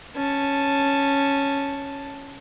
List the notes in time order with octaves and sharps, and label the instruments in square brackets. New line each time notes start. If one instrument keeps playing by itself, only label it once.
[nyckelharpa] C#4 A5